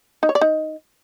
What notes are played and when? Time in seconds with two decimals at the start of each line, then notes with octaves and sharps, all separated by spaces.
0.23 D#4
0.29 C#5
0.35 D5
0.41 D#4